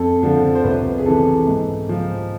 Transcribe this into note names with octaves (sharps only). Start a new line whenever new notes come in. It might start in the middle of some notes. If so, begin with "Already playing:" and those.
Already playing: F2 A4
D3 F3
C5
C2 B4
G#4
C3 E3 A4
G#2
F3